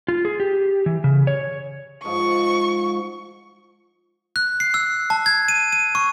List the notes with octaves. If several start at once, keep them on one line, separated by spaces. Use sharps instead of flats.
F4
G#4
G4
E3
C#3
C#5
G#2 F3 C#6
F#6
C7
E6
A5
G#6
D#7
D#7
C#6